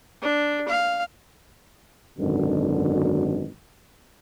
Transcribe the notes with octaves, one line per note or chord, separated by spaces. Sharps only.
D4
F5
G#1 F#2 B2 D3